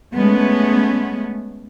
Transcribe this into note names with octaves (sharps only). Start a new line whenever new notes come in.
G#3 A3 B3 C#4